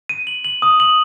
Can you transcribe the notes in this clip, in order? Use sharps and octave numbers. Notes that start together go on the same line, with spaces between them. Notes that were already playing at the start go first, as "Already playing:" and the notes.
D#7
F#7
F#7
D#6
F#7